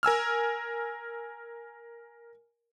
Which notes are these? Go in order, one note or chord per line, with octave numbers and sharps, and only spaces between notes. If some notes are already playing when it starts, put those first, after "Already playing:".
A#4 G#5 E6 F6